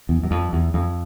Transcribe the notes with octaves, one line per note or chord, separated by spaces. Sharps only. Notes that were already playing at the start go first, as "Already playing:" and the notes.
E2
F#2
F2
E2
F2